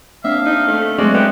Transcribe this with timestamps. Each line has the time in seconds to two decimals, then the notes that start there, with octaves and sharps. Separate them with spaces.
0.24 A#3 C4 D4 E5 F5
0.46 D#4
0.68 A3
0.98 F#3 G#3 A3 C4 F#4 D5
1.14 B3 G5